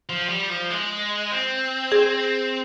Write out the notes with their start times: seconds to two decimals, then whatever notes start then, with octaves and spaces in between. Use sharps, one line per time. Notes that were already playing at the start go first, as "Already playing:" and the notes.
0.09 F3
0.29 G3
0.50 F3
0.70 G#3
1.31 C4
1.92 G#4